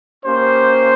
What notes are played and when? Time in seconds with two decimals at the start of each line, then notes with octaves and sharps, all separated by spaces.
0.25 A#3 C#4 G4 C5